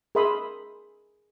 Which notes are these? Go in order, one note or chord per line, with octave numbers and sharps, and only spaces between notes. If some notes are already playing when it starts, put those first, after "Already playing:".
G#4 A#4 E5 B5 C6 D#6